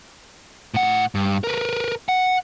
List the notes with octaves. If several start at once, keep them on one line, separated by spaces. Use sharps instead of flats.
A2 F#5
G2
A#4 B4
F#5